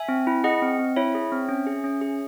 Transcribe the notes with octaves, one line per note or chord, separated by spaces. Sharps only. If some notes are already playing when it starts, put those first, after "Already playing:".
Already playing: E5 G#5
C4
E4
G#4 D#5 F#5
C4
C4
E4 C#5 E5
G#4
C4
C#4
G#4
C#4
G#4